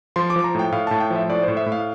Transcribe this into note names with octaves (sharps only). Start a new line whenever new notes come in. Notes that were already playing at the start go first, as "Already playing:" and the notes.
F3 C6
D6
F3
A#5
A2 G5
A2 F5
A2 A5
G5
F3 E5
A2 D5
A2 C5
E5
A2
F5